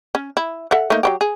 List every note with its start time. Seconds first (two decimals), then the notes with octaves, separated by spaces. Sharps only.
0.15 C#4
0.37 E4
0.71 A4 E5 F#5
0.90 A3 A#3 D#4
1.03 F#3 A3 G4
1.21 G#4